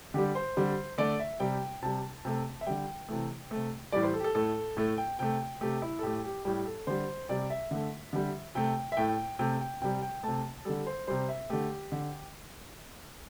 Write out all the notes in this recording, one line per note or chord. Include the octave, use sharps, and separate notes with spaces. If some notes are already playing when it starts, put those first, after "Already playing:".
D3 G3 G4
C5
D3 G3
D3 A3 D5
E5
C3 G3 G5
C3 G3 A5
C3 A3
E5
D3 G3 G5
C3 E3 A3
C3 A3
A2 E3 G3 D5
C5
A4
G4
A4
A2 A3 A4
A2 A3 A4
G5
C3 A3 G5
C3 A3 G4
E4
A4
A2 A3 G4
G4
A2 G3 G4
A4
D3 G3 C5
C3 G3 D5
E5
D3 A3
D3 G3
C3 A3 G5
E5
A2 A3 G5
C3 A3 G5
G5
C3 G3 G5
G5
C3 A3 A5
D3 G3 A4
C5
C3 G3 C5
E5
D3 A3 G4
D3